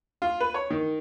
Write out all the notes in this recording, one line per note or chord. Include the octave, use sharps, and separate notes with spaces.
F4
B4
C#5
D#3